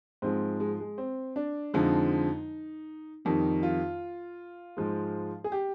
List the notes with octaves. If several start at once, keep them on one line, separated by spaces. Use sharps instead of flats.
G#2 F3 G#3 C4
G#3
G#3
C4
D4
F2 D3 F3 G#3 D#4
F2 D#3 G3 D#4
F4
G#2 F3 G#3
G#4
G4